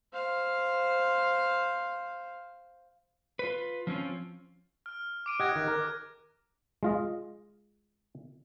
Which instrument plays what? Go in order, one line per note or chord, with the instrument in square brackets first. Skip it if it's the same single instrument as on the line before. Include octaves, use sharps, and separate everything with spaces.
[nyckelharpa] C5 F5
[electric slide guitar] F4 B4
F3 C4 C#4 F4
[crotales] F6
D6 D7 D#7
[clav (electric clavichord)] G4 D#5 F#5 [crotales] F#6 G#6 A#6
[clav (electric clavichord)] D#3
A#4
G#3 F4 D#5